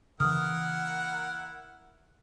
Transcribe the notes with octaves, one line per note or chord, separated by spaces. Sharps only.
C#3 E3 A#3 E4 A#4 F#5 D#6 F6